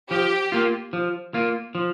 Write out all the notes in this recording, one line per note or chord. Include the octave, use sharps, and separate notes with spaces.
F3 G4
A#3 F4
F3
A#3 F4
F3